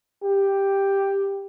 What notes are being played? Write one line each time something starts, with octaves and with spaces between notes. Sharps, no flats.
G4